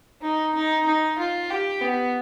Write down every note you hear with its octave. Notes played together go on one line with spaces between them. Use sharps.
D#4
D#4
D#4
F4
G4
B3